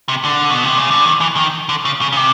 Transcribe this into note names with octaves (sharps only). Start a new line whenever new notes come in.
C3
D3
B2
C3
C#3
D3
D#3
E3
D#3
D3
C#3
C#3
C#3
C3